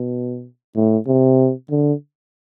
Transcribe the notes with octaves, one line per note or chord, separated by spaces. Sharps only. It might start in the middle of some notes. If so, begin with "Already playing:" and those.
Already playing: B2
A2
C3
D3